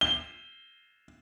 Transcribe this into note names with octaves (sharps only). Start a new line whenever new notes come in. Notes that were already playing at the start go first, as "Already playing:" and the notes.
G7